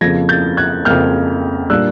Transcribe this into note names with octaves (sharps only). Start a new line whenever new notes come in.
F2 C#3 F3 A#3 G#6 A#6
G6 A6
F#6 G#6
F2 C#3 F3 A#3 F6 G6
A#2 G3 A#3 D4 E6 F#6